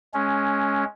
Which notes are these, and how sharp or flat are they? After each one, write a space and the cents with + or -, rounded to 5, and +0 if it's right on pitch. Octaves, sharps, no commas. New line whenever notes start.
G#3 +15 C#4 +0